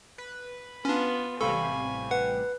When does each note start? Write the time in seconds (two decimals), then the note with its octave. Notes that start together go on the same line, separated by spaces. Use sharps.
0.18 B4
0.85 B3 C#4 D4 F4
1.41 A1 C3 G3 A4 F5 G#5 B5 C#6
2.11 B4 F#5